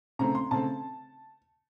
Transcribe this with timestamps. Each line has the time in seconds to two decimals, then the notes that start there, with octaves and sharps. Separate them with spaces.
0.19 C#3 A3 C4 A#5
0.35 C6
0.51 C#3 A3 C4 A5